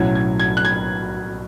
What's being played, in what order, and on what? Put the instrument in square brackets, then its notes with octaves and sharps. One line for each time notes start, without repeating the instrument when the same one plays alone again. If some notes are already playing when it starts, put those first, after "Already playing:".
Already playing: [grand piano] B1 A2 F#3 C#4 G#6
G#6
G#6
F#6
G#6